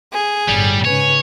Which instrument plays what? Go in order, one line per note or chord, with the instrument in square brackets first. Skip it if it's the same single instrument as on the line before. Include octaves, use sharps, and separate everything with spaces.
[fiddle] G#4
[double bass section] G1 A2 [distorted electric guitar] G3
[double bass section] G#2 C#3 [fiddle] B4 G#5 [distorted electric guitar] C#5